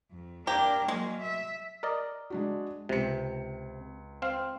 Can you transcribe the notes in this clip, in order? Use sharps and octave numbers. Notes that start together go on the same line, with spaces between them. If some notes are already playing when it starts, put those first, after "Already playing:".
F2
A#3 D4 G4 A#4
F#3 G#3 A#3
E5
A#4 D5 D#5
G#3 D4 F#4
C#2 C3 C#7
C4 F5